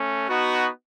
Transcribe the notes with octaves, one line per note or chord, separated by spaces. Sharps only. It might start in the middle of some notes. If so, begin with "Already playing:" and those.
Already playing: A3 C#4
B3 D#4 F#4